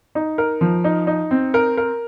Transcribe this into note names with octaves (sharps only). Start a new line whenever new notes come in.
D#4
A#4
F3
D#4
D#4
C4
A#4
A#4